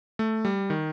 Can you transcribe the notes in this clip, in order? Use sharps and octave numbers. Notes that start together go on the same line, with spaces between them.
A3
G3
D#3